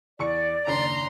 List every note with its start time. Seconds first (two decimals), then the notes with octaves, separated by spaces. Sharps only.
0.19 E2 D5 C#6 C#7
0.67 F#1 D#2 D4 A#5 C6